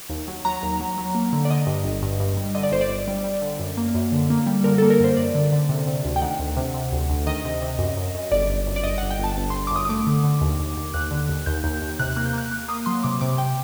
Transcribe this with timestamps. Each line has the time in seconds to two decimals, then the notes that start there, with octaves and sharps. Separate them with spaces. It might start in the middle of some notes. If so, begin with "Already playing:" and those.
0.10 D#2
0.28 F#3
0.45 F#3 A#5
0.63 D#2
0.80 F#3
0.98 F#3
1.15 A#3
1.33 D3
1.45 D5
1.50 D3 D#5
1.67 G2
1.84 G1
2.02 G2
2.19 G2
2.37 G3
2.55 D3 D#5
2.63 D5
2.72 G1 C5
2.81 D5
2.89 G1
3.08 G3
3.24 G3
3.41 D3
3.59 F#2
3.77 A#3
3.94 F#2
4.12 D3
4.30 A#3
4.46 G3
4.64 D3 A#4
4.78 A#3 A4
4.90 A#4
5.00 F#2 C5
5.17 F#2 D5
5.35 D3
5.52 D3
5.69 C3
5.87 C3
6.05 D2
6.16 G5
6.22 D#3 F#5
6.39 D2
6.57 C3
6.74 C3
6.92 D2
7.10 D2
7.27 D#3 D#5
7.45 C3
7.62 C3
7.79 F#2
7.97 F#2
8.15 F#2
8.32 G1 D5
8.49 G1
8.67 F#2
8.76 D5
8.84 G1 D#5
8.98 G1 F#5
9.10 G5
9.19 G1 A5
9.37 G1 A5
9.50 G1 C6
9.67 D6
9.71 F#2 D#6
9.85 D#6
9.89 A3 D6
10.07 D3
10.24 D3
10.41 D#2
10.59 D#2
10.77 D#2
10.94 D#2 F#6
11.11 D3
11.29 D#2
11.46 D#2 G6
11.64 D#2
11.82 D#2
11.99 C3 F#6
12.13 A#3 F#6
12.26 G6
12.33 A#3 F#6
12.51 A#3
12.68 A#3 D#6
12.86 F#3 C6
13.04 C3 D6
13.21 C3 D6
13.38 C3 G5